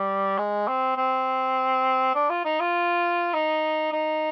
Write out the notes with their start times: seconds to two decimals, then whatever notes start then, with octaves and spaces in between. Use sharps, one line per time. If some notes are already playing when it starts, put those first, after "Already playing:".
Already playing: G3
0.38 G#3
0.68 C4
0.97 C4
2.15 D4
2.30 F4
2.45 D#4
2.60 F4
3.34 D#4
3.92 D#4